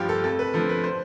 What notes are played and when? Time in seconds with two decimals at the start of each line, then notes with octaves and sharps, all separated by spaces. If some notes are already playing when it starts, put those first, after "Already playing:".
Already playing: G2 F3 F4 G4
0.09 A4
0.24 F2 A4
0.39 B4
0.53 D3 F3 A4
0.69 B4
0.84 C5